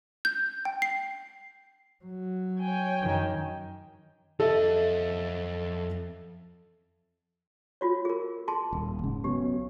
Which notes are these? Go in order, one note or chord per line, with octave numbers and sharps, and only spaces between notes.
G6
G5
C7
F#3
C#5 G5 G#5
F#2 D#3
F2 A4 D#5 E5
F4 F#4 C#5
G#4 A#4
G#4 A5 C6
D#1
G#2 C#3
B1 B2 C#4 G4